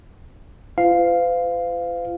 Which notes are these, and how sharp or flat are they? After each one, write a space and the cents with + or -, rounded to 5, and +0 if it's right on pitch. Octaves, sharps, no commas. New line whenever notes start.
F4 -35 C5 -45 F5 +0